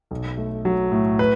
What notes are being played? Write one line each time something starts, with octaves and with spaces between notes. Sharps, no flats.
B1
A3
F#3
A2
B4